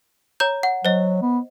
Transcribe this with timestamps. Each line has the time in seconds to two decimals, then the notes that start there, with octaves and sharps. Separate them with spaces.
0.40 C#5 A#5 G6
0.63 F#5
0.85 F#3 C5 D#5
1.22 B3